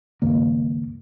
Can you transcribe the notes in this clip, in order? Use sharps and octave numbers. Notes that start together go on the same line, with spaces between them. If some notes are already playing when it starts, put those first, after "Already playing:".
C#2 G2 D#3 A#3